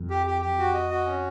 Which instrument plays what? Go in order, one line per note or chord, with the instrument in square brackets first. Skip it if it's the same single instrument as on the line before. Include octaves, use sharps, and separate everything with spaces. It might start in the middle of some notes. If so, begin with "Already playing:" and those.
Already playing: [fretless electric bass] F2
[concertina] G4
G4
G4
F#4
D#5
F#4
C#4